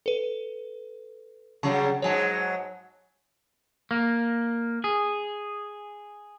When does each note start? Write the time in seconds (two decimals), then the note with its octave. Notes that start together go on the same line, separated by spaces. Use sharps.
0.06 A4 B4
1.63 C#3 F#3 G3 A5 C#6
2.02 G#2 F#3 G#3 C#5 G#5 A5
3.91 A#3
4.84 G#4